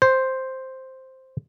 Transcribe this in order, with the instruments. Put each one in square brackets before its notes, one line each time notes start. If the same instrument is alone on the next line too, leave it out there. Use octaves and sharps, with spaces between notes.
[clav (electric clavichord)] C5